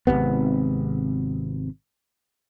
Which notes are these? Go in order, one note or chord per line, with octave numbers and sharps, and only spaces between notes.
G#1 E2 C3 B3